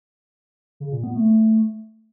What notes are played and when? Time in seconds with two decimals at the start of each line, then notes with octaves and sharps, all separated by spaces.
0.80 C#3
0.92 A#2
1.04 B3
1.15 A3